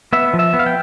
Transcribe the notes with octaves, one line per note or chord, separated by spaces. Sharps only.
B3 E5
F3
E5
B3
F5
G5